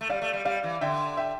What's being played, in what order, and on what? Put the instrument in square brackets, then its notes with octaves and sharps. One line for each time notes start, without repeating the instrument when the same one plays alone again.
[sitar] A3
[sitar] G3 [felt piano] D5 F5
[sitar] A3
G3
[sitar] G3 [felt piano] D5 F5
[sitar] E3
[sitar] D3 [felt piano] E5 G5
[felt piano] E5 G5